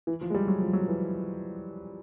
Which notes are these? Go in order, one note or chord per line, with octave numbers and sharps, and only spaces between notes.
E3
F3
G#3
G3
F#3
F3
F#3
F3
E3